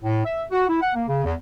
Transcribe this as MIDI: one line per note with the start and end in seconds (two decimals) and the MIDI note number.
0.03 0.23 45
0.25 0.42 76
0.51 0.66 66
0.69 0.79 64
0.82 0.92 78
0.94 1.03 58
1.08 1.22 49
1.25 1.34 40